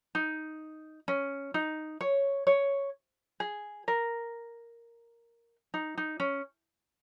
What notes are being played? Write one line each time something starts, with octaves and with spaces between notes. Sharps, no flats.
D#4
C#4
D#4
C#5
C#5
G#4
A#4
D#4
D#4
C#4